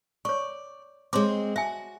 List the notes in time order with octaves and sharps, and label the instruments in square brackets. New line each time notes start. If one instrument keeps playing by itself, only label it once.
[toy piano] C#5 C#6 [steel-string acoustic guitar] D5
[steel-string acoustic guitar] G#3 C4 [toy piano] C#5 C6 D6
[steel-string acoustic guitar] F#4 [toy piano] E5 G#5